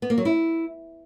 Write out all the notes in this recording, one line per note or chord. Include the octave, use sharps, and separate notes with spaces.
B3
A#3
F#3
E4